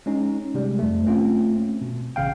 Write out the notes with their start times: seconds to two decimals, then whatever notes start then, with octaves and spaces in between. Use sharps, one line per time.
0.06 G#3 C#4 D#4
0.54 C3 G3 G#3
0.79 F2 A3
1.07 A3 A#3 C4 C#4 F4
1.81 B2
2.16 A1 C#3 F5 G5